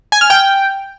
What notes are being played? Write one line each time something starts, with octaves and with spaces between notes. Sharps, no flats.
G#5
F6
G5